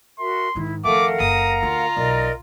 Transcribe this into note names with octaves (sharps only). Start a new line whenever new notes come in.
F#4 A#4 E5 C6
G#2 D#3 E4
F2 D#3 A3 A#4 F5 F#5 D6
F#1 A#5 D#6
D2 F4
B1 A#4 D5 D#5